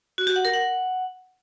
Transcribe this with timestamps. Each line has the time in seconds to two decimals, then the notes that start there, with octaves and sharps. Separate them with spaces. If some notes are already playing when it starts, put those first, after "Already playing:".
0.18 F#4
0.27 G4
0.36 F#5
0.45 A#4
0.53 F#5